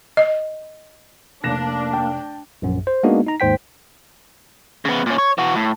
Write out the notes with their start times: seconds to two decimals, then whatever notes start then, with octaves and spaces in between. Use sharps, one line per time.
0.17 D#5
1.44 F1 A#3 D4 F#6 A#6 E7
1.93 G5 A5
2.62 A#1 F#2
2.87 C5
3.03 G#3 A#3 B3 D4 D#4 F#4
3.26 D#4 A#5
3.40 D#2 G#2 C5 G5 B6
4.85 C#3 B3
5.06 A#2 C#4
5.18 C#5
5.38 E3 F#4
5.55 A2